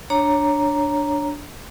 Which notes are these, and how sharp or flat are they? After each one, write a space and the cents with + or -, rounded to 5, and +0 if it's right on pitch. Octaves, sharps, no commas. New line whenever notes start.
D4 +0 C#5 +0 A#5 +0